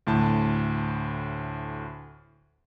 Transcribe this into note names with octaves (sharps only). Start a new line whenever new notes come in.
D2 A2 A5